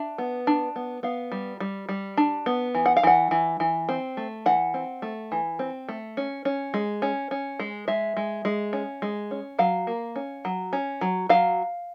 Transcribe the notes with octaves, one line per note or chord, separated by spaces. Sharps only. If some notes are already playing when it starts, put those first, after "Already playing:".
Already playing: D4 E5
B3
D4
B3
B3 F5
G3
G3
G3
D4
B3
E3
F#5
F5
E3 F#5
E3
E3
C4
A3
E3 F#5
C4
A3
E3
C4
A3
C#4
C#4
G#3
C#4
C#4
G#3
G#3 E5
G#3
G#3
C#4
G#3
C#4
F#3 F5
A#3
C#4
F#3
C#4
F#3
F#3 F5